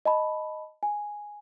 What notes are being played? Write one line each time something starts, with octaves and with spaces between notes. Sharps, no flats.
D#5 A5 B5
G#5